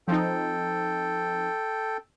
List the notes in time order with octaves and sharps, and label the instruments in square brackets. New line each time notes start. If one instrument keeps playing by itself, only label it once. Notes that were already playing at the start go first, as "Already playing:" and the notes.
[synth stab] F3 C4 D#4 [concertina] A4 G5